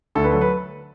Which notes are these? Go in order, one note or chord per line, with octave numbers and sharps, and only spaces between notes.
D2 A4
B4
F#3 A4
B4